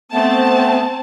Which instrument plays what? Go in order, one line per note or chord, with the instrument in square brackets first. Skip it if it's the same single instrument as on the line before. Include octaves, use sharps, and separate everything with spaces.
[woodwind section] A3 B3 [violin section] C4 A5